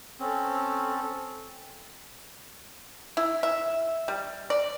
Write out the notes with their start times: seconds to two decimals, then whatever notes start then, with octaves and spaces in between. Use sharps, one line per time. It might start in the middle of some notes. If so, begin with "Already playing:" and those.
0.20 C4 C#4 A4
3.17 E4
3.43 E5
4.08 G3
4.50 D5